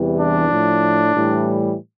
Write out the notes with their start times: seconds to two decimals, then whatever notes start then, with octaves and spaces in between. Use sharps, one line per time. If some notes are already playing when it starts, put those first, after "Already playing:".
Already playing: E2 C3 E3 G3
0.18 D4
0.49 A2 F3
1.12 A2 E3 G3